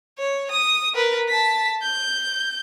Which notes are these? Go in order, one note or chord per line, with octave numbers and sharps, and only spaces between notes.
C#5
D#6
A#4 B4
A5 B6
G6